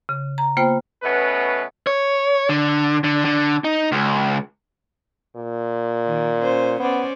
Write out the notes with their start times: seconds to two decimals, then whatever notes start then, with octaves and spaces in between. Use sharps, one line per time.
0.09 C#3
0.38 A#5
0.57 A#3 B3 F4 C5 G5
1.03 B2 A3 B3 C#4 B4
1.87 C#5
2.49 D3
3.04 D3
3.25 D3
3.64 D#4
3.92 C#2
5.36 A#2
6.06 D#3
6.39 C#4 C5
6.80 B3 C#4 C5 D5